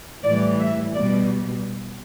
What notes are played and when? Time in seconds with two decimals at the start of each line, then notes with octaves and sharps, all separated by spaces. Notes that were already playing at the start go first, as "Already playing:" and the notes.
0.23 A2 E3 G3 D5
0.59 E5
0.95 B2 G3 D5